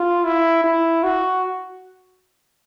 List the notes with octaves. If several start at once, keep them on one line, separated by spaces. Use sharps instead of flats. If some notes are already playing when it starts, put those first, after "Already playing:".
Already playing: F4
E4
E4
F#4